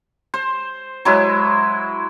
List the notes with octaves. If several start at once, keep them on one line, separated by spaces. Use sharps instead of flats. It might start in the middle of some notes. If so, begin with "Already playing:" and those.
C5
F#3 G#3 E4